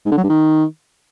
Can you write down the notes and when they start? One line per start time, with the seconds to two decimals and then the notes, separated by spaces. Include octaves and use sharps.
0.06 G#2
0.12 D3
0.18 F#3
0.24 G2
0.30 D#3